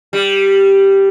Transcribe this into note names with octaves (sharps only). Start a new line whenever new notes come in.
G3